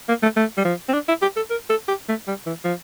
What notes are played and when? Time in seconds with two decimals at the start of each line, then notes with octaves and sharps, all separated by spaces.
0.08 A#3
0.23 A3
0.36 A3
0.57 G3
0.65 F3
0.88 C4
0.94 D4
1.08 E4
1.22 G4
1.36 A4
1.50 A#4
1.70 A4
1.88 G4
2.09 A3
2.28 G3
2.46 E3
2.65 F3